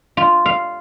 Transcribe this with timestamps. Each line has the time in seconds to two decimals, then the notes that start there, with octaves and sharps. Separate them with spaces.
0.17 F4
0.46 F5